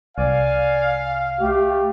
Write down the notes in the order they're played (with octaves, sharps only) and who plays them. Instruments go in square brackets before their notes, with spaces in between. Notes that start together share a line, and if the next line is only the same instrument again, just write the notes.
[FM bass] C2 [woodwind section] D5 G#5 [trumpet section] F5
[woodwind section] A3 [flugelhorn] G4